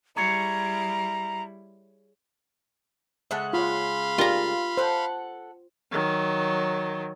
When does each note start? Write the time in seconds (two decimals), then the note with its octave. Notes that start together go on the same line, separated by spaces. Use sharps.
0.17 G3 E4 G#4 C#5 A#5
3.31 C#3 G#3 E5 F#5 A5
3.53 F4 C#5 F5 B5 C6
4.18 F4 G4 A#4 D5 A#5
4.77 A4 C5 F#5
5.91 D#3 F#3